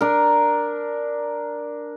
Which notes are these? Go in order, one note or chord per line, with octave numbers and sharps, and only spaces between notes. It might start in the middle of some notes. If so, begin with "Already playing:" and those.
D4 A#4